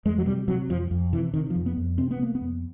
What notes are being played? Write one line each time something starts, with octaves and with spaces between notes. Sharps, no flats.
F2 G#3
F#3
C3 G3
C3 F#3
F2 F3
F2
C3 E3
C3 D#3
F3
F2
B3
F2
C3 C4
B3
C3 A#3
B3
F2